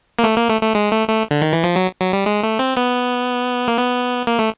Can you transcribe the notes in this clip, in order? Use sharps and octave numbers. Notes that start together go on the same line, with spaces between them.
A#3
A3
A#3
A3
A3
G#3
A3
A3
D3
D#3
E3
F3
F#3
F#3
G3
G#3
A3
C4
B3
A#3
B3
A#3
A3